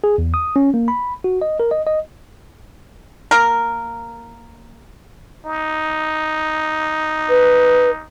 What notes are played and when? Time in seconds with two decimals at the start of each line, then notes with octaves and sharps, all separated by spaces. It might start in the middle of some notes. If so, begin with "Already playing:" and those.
0.04 G#4
0.18 E2
0.34 D#6
0.56 C#4
0.74 A#3
0.88 B5
1.24 F#4
1.41 D#5
1.60 A#4
1.71 D#5
1.87 D#5
3.31 A#3 A#4
5.45 D#4
7.29 B4